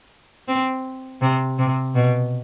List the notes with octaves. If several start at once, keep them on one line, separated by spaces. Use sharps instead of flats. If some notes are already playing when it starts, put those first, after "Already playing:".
C4
C3
C3
B2